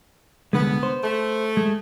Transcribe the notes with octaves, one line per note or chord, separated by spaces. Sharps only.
C2 D3 G#3 B3
C5
A3
G#3